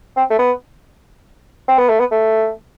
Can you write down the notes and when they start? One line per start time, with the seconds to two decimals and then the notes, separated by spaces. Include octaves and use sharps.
0.17 C4
0.30 A3
0.39 B3
1.68 C4
1.78 B3
1.89 A3
2.00 B3
2.11 A3